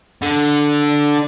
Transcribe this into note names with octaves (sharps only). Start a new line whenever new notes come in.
D3